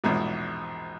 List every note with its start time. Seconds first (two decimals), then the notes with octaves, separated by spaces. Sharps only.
0.04 A#1 E2 G#2 B2